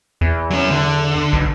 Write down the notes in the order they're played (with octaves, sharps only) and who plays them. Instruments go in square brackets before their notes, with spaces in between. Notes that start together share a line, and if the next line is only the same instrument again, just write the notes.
[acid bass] E2
[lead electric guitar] F#3 C#4
D3
[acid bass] B1